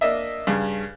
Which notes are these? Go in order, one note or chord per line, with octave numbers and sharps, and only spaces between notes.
A#3 D4 D#5 E5
G2 C#3